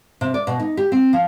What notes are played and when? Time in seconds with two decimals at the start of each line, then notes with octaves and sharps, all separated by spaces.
0.21 C3
0.34 D5
0.47 B2
0.60 D#4
0.77 G4
0.92 C4
1.13 F3